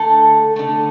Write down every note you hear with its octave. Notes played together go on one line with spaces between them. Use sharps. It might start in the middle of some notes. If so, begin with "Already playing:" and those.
Already playing: D3 A3 A4
D3 A3